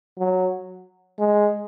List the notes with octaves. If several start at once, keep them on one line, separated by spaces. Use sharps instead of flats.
F#3
G#3